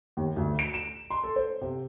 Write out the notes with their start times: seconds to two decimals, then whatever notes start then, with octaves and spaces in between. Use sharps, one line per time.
0.17 D#2
0.36 D2
0.59 D7
0.74 E7
1.11 C6
1.23 A4
1.36 C5
1.61 C3